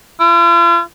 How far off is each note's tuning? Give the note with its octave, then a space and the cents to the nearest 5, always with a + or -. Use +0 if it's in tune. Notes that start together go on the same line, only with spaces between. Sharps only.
F4 -45